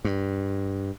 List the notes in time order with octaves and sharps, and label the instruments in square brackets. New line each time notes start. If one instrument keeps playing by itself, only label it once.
[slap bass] G2